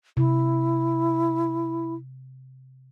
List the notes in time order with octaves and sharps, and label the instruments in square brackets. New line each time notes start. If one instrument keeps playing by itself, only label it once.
[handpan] C3 [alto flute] E4